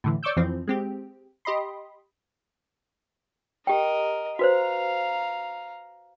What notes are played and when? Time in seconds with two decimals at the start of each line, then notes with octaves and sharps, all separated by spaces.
0.04 A2 D3 E3
0.23 C#5 D5 C#6 D6 E6 G6
0.36 F2 E3 F3 C4
0.67 G#3 C4 G4
1.45 G4 D#5 B5 C6
3.67 G4 A#4 D#5 G5
4.39 F#4 B4 C5 F5 A#5